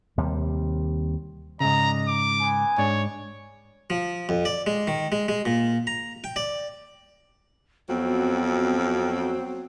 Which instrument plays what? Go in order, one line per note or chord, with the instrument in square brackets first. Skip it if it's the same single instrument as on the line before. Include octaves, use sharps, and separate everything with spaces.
[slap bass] D#2 C3 G3
[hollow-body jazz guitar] G#2 C#3 [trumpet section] G#3 D5 D#5 [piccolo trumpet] A#5
[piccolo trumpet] D6
[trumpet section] B3 G#5
[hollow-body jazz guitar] G#2 D4 [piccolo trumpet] C#5
[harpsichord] F3
F2
D5
G#3
D#3
G#3
G#3
A#2
A#5
G5
D5
[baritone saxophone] F2 [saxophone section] F#3 C4 F#4 [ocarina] B3